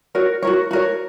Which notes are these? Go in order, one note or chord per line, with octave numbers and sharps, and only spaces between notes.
F#4 A#4 C#5
F#4 A#4 C#5
F#4 A#4 C#5